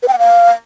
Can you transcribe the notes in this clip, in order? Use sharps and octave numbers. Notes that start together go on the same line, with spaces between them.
B4
G5
F#5
F5